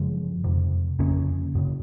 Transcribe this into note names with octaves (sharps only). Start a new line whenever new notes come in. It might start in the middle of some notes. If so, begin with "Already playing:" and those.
Already playing: F#2 C#3 F3 G#3
F2 C3
F2 C#3 A#3 C#4
F#2 C#3